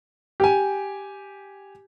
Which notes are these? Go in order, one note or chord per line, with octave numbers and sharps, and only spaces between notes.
G4 G#5